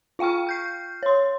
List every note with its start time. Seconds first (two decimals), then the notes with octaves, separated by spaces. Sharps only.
0.19 F4 F5 G5 C#6 F6
0.47 F6 G6 C7
1.03 C#5 C6